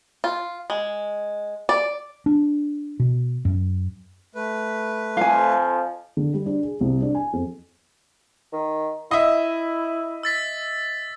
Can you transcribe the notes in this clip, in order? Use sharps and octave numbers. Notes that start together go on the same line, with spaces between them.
F4
G#3
D5
D4
B2
F#2
A3 B4
F2 F3 F5 G#5
D3
G3
D4
G#4
C2
D4
G#5
F2
D#3
E4 D#5 E5
E6 A6 B6